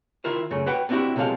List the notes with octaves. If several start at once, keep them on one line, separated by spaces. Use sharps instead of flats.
D#3 E4 F4 A#4 C5
F#2 C#3 A3
F#4 B4 F#5 G5
B3 C4 D4 E4 F#4 G4
B1 C3 F3 G#3 A4 F5